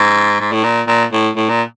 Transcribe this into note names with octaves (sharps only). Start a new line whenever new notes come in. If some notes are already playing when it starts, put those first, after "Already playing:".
Already playing: G#2
G#2
A2
A#2
A#2
A2
A2
A#2